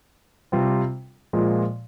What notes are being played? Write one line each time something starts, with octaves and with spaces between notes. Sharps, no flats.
C3 G3 C4 F4
A#2 F3 G#3